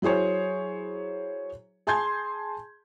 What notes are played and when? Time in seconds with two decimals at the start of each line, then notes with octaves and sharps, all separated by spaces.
0.02 F#3 E4 G#4 C5 C#5
1.87 G#4 G#5 A5 C6 G6 G#6